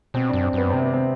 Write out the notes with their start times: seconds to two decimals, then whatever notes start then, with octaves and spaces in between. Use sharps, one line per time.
0.14 B2 C4
0.29 F#2 D4
0.44 C4
0.53 F#2 B3
0.70 C3 C4
0.82 B3
0.94 C4